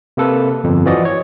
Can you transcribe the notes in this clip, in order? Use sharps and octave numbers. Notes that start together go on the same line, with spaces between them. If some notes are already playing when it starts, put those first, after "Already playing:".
C3 A#3 A4 B4
G1 F2
E3 F3 F#4 D5 D#5
C#5